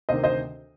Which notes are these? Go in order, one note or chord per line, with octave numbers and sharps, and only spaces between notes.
D2 C3 D#3 C5 D#5
C5 D#5